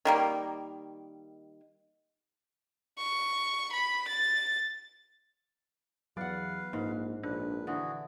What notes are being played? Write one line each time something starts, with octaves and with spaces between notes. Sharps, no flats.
D#3 G3 A#3
C#6
B5
A6
E2 F#3 B4 D5 F5 F#5
A#1 G#2 A#3
A#1 D4 B4
D3 E3 F#4 G#4